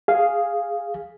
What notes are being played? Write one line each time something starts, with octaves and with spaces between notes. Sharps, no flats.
G#4 F5